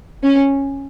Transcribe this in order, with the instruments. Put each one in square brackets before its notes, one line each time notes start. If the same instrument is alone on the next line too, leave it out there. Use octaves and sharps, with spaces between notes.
[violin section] C#4